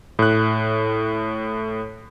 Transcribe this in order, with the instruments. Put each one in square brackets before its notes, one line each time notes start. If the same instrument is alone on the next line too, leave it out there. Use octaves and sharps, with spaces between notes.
[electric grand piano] A2 F#6